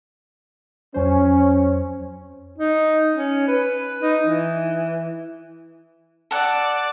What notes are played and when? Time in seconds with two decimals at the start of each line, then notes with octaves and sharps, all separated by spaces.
0.94 F2 F#3 C#4 C5
2.58 D#4
3.14 C#4
3.48 B4
4.02 D#4
4.27 E3
6.31 A4 D5 F#5